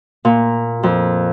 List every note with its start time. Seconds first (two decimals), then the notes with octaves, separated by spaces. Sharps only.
0.25 A#2
0.83 F2